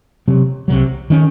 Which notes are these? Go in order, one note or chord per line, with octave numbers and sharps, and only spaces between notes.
C3 F#3 C4
C2 C3 D#3 F#3
D#3 A#3 C#4